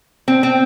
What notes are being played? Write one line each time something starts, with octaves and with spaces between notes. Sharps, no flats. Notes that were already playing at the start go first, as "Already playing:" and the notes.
C4
C4